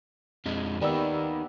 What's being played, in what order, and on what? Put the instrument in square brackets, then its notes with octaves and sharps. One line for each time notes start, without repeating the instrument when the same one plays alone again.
[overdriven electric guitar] F2 G#3
[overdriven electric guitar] D#3 A#3 [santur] G3 B3 E5